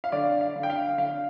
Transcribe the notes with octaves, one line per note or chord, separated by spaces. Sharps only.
F5
D3 D5
F5
D3
G5
F5
D3 F5